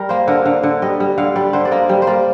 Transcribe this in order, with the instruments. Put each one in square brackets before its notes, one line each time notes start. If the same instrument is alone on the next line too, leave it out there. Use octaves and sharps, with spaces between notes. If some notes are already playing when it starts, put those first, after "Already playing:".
Already playing: [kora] G3 A#4
A#3 C5
D3 A#4
D3 F5
D3
G3 D#5
G3
D3 F5
G3 D5
D3 C5
D5
A#3 D#5
G3
C5
A#3 D5